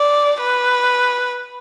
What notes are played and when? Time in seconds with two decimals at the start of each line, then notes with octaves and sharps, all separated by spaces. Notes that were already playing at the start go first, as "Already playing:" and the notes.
Already playing: D5
0.41 B4